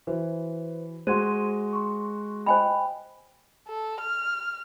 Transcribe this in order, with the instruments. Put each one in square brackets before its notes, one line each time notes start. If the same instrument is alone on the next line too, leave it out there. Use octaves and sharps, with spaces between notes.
[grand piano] E3 [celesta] F#4 B4 C5
[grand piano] G#3 F#4 [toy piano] C5 [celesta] C6 G#6 D#7
[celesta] C6 C#6
[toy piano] C5 G#5 B5 [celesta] D#5 G5
[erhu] A4
F6